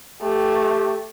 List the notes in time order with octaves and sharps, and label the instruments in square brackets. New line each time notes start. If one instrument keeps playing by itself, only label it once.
[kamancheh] A3 [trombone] G4